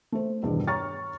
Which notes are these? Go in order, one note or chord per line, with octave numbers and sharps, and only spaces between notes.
A3 C5
E2 G2 B2 D#3
C#5 A#5 C#6 F6 A6